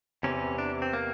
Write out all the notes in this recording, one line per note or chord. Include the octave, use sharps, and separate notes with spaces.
E2 C3 E3 C#4
D4
C4
A#3